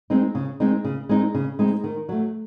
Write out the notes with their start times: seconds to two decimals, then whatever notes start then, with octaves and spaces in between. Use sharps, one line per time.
0.10 G#3 C4 D#4
0.35 C#3
0.60 G#3 C4 D#4
0.85 C#3
1.09 G#3 C4 D#4
1.35 C#3
1.59 G#3 C4 D#4
1.84 D#3
2.09 F#3 A3